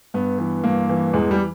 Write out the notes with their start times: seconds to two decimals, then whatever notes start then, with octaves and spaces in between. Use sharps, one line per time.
0.14 G2 B3
0.38 E3
0.64 G2 A#3
0.89 E3
1.13 E2 G#3
1.31 G3